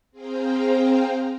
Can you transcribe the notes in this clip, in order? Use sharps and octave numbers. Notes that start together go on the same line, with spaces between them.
C4 G#4 C5 F5 G5 A#5